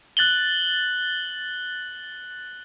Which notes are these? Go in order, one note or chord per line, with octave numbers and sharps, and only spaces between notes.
F#6 A6 F#7 G7